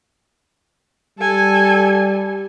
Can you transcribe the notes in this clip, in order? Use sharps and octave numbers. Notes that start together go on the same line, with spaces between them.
G3 A4 G#5